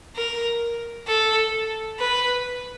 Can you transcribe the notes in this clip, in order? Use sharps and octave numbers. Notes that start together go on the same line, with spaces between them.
A#4
A4
B4